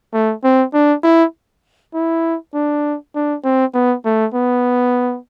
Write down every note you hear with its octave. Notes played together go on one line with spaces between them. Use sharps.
A3
C4
D4
E4
E4
D4
D4
C4
B3
A3
B3